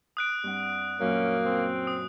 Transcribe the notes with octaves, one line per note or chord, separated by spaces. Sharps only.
D#6 F#6 D7
G2 C4 F#5
F#2 A#2 A#3 C#4
C4
D#6